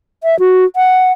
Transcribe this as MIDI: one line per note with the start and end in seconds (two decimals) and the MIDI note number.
0.24 0.39 76
0.39 0.65 66
0.76 1.12 78